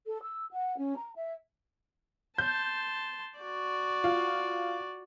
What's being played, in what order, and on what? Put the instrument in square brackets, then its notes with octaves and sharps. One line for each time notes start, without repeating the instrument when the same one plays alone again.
[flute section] A4
E6
F#5
C#4
A#5
E5
[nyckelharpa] A5 C6 [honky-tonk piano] G6
[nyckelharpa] F#4 D5
[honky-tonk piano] F4